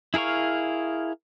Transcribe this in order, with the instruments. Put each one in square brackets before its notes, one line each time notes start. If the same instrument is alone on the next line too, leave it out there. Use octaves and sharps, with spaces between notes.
[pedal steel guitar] E4 G#4 A#4 F5 C#6